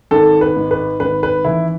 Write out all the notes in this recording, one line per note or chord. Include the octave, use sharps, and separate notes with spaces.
G#1 A4
B4
G#2
B4
G#1 B4
B4
E3 E4